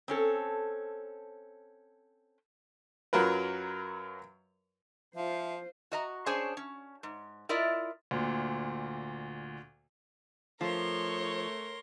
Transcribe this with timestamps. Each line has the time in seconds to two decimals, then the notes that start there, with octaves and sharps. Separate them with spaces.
0.08 C4 C#4 A4
3.13 F#2 F#3 F4 A#4 B4
5.16 F3 F4 C5 E5
5.92 F#4 D#5 A#5
6.26 C#4 D4 G#4 C5 C#5 G#5
6.57 C#4
7.03 G#2
7.49 E4 F4 A#4 D5 D#5
8.11 D2 A#2
10.61 F3 A3 A#4 C#5 C6